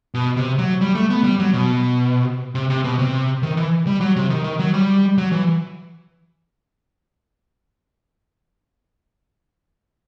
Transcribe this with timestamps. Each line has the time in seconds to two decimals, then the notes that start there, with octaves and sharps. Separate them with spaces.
0.14 B2
0.36 C3
0.58 F#3
0.81 G3
0.95 A3
1.10 B3
1.24 G3
1.39 F#3
1.53 B2
2.55 C3
2.70 C3
2.84 B2
2.99 C3
3.43 D#3
3.57 E3
3.87 G3
4.01 F#3
4.16 C3
4.30 D#3
4.44 D#3
4.59 F#3
4.74 G3
5.18 F#3
5.32 E3